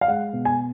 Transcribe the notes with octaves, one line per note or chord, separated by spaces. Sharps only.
F5
G#3 F#5
B2
G#5